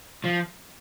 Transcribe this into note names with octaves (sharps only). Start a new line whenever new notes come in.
F3